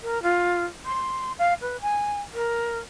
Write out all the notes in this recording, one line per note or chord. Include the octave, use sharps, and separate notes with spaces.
A#4
F4
C6
F5
B4
G#5
A#4